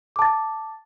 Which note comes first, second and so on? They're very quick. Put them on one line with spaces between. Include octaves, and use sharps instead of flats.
D6 A5 A6